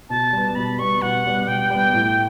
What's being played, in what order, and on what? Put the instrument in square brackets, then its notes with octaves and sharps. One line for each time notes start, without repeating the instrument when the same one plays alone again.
[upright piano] B2 [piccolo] A5
[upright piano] G3 B3
[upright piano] B2 [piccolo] B5
[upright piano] G3 B3 [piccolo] C#6
[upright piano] B2 [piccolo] F#5
[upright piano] G3 B3
[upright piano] B2 [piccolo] G5
[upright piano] G3 B3
A2